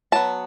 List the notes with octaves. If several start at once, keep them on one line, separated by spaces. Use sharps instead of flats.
F#3 B3 A5